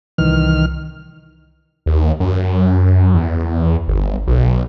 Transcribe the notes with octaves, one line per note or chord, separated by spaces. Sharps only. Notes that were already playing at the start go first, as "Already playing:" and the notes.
C2 D#3 E3 F6
D#2
F#2
E2
G1
B1